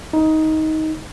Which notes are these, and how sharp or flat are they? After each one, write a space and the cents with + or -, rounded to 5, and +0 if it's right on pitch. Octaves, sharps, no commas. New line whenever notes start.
D#4 +15